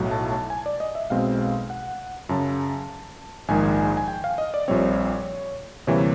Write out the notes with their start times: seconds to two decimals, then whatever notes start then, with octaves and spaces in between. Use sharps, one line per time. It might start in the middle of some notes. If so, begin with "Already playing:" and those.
Already playing: B1 A2 F#3
0.11 A5
0.30 A5
0.50 G#5
0.66 D5
0.80 D#5
0.95 E5
1.10 B1 B2 G#3 C4 F5
1.70 F#5
2.29 F#2 C#3 F#3 A5
3.48 A#1 G#2 D#3 G#3 G#5
3.97 G#5
4.08 G5
4.24 F5
4.38 D#5
4.54 D5
4.68 A#1 A#2 G3 C4 C#5
5.87 D2 C3 E3 G3 A#3 C#5